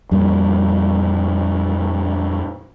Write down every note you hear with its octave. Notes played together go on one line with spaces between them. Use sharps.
F2 A#2 G3